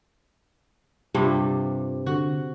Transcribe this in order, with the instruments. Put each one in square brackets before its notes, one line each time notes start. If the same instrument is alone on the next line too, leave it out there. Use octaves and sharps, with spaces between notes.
[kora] G2 C3 G3 [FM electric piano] F4
[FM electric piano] D3 [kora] F#4